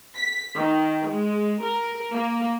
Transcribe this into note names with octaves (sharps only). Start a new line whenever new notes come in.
B6
D#3
G#3
A#4
A#3